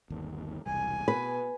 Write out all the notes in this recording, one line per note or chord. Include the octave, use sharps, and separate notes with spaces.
G1 D#2
E1 C2 G#5
B2 B4